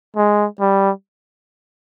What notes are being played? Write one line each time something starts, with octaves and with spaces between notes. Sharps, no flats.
G#3
G3